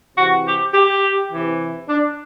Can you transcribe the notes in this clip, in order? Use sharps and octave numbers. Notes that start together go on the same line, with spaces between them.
C3 E3 F#4
G4
G4
C3 E3
D4